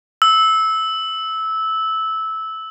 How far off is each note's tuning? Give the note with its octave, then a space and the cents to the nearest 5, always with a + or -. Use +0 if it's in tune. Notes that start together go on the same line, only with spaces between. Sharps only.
E6 -15